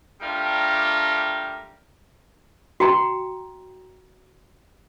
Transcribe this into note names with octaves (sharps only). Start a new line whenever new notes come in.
G3 A3 D4 F4 G4 A#4
F#4 G5 A#5